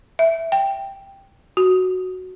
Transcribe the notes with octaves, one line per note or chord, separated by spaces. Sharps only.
E5
G5
F#4